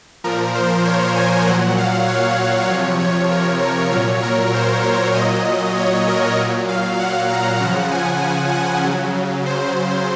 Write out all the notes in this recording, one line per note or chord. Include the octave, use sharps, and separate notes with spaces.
A#2 F3 A#4
C5
C#5
G#5
A#2 F#3 F#5
F5
C#5
C3 F3
C#5
A#4
A#4
A#2 F#3 C#5
A#4
C5
C#5
A#2 F#3 D#5
C#5
A#4
A#2 F#3
F5
F#5
A#5
C#3 F3 F#5
G#5
F#5
C#3 F#3
C5